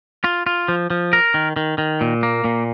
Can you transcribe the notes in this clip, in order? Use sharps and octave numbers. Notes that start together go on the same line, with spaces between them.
F4
F4
F3
F3
A#4
D#3
D#3
D#3
A#2
A#3
A#2